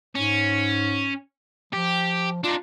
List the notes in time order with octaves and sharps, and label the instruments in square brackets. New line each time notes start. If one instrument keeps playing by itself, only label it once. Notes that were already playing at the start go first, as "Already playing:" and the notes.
[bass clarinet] G#2 [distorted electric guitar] C#4
[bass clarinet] F3 [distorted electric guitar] G4
[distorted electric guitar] D4 D#4 [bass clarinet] F4